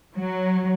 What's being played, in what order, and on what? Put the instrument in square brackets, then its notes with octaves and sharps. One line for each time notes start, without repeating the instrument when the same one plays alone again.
[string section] F#3